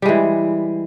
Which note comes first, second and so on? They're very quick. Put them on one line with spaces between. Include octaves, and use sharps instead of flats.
G3 G#3 E3